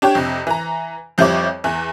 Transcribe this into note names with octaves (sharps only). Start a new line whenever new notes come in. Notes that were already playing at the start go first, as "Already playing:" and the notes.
D4 G4 C#5 G5
F2 C3
E3 A#5
F2 F3 G3 E4 C#5 D6
E2 E3